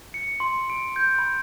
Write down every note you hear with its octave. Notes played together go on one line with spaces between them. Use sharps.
C#7
C6
D7
G6
B5